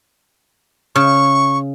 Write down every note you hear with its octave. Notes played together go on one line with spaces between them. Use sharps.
C#3 C#6